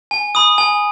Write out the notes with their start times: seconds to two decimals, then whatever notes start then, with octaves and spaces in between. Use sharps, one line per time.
0.11 G#5
0.35 B5 D#6
0.58 G#5